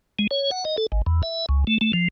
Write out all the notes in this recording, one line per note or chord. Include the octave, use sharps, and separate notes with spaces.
G#3
C#5
F#5
D#5
A4
G#1
E2
E5
C#2
A3
A3
F3